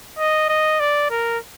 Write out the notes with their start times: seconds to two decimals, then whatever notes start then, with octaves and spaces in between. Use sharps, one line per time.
0.18 D#5
0.49 D#5
0.80 D5
1.11 A#4